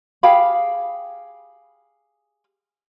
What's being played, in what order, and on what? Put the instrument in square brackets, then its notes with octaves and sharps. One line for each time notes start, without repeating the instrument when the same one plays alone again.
[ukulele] G4 G#4 F5 B5